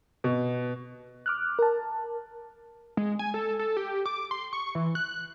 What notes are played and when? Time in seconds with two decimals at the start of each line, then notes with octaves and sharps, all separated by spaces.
0.24 B2
1.26 D6 F6 F#6
1.59 A#4 A5
2.97 G#3
3.19 G#5
3.34 A4
3.59 A4
3.77 G4
4.06 D6
4.31 C6
4.53 C#6
4.75 E3
4.95 F#6